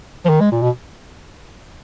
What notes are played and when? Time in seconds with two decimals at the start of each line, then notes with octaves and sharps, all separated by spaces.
0.25 F3
0.29 D#3
0.40 G#3
0.52 A#2
0.62 B2